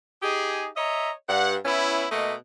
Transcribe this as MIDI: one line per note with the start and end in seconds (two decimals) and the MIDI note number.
0.22 0.68 63
0.22 0.68 67
0.22 0.68 68
0.76 1.10 73
0.76 1.10 75
0.76 1.10 76
0.76 1.10 82
1.28 1.54 43
1.28 1.54 78
1.65 2.05 59
1.65 2.05 61
1.65 2.05 64
2.10 2.34 47
2.10 2.34 57
2.10 2.34 58
2.10 2.34 75